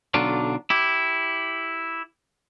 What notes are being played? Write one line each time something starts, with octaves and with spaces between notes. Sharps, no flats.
B1 D3 F#3 D4 F4
E4 G4